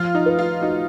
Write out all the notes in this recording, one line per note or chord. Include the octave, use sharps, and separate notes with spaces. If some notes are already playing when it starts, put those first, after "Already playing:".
Already playing: F3 F4
D#4
B4
F4
D#4 F#4